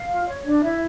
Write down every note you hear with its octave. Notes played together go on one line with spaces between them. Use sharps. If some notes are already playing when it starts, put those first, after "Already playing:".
Already playing: F5
F4
C#5
D4
E4 E5